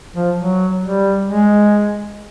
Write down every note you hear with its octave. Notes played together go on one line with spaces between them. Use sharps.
F3
F#3
G3
G#3